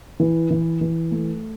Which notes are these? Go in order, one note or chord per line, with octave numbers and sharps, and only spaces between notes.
E3
E3
E3
A3